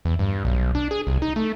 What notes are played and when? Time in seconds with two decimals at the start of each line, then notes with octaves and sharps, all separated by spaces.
0.05 E2
0.19 G2
0.45 B1
0.75 D4
0.91 G#4
1.07 C2
1.22 D#4
1.36 A3